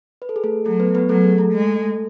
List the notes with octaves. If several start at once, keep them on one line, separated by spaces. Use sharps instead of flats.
B4
A4
G#4
A3 A4
F#3 A3 A4
B3 B4
B3 B4
F#3 A3 A4
G#4
A3 A4
G#3